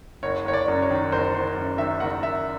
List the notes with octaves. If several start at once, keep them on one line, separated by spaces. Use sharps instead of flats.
F#1 C#5
F#1 C#5
D5
F#2
C#5
D#3
F#1 C5
F#1 C5
F#2
D#3 E5
F#1 F#5
F#1 E5